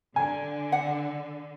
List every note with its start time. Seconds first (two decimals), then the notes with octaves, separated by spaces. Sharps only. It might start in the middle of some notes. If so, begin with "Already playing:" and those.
0.16 D3 G#5
0.72 F#5